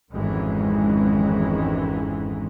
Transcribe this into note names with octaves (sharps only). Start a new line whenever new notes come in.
G#1 F2 D#3 E3 G#3 C#4